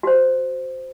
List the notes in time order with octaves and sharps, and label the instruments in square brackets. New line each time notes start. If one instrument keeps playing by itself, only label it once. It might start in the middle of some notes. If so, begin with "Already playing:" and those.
[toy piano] F#4 C5